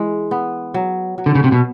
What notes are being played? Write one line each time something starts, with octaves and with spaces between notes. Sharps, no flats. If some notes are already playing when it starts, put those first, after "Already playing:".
Already playing: E3 G#3
B3
F#3
F#3
D3
C#3
C3
B2